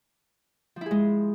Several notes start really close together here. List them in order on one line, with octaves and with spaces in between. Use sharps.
F3 E4 G#4 G#3